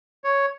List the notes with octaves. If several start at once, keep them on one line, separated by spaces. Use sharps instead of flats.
C#5